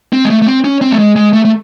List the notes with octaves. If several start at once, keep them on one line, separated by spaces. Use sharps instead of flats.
C4
G#3
A3
A3
C4
C#4
C4
A3
G#3
G#3
A3
A3